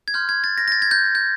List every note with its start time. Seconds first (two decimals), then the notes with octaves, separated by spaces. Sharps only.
0.08 G#6
0.14 C6 F6 G6
0.29 G#6
0.44 A6
0.58 A#6
0.68 A#6
0.72 A6
0.82 G#6
0.91 G6
1.15 G6